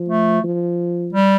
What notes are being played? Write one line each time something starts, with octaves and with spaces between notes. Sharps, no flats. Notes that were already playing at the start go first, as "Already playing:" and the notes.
Already playing: F3
A3
F3
G3